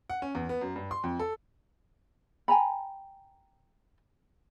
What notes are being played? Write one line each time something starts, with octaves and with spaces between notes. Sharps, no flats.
F#5
C#4
E2
B3
F#2
G2
C6
F2
A4
G5 G#5 A#5 B5